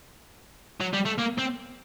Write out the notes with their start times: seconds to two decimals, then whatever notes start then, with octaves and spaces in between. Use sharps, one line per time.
0.81 F#3
0.94 G3
1.06 A3
1.19 A#3
1.39 C4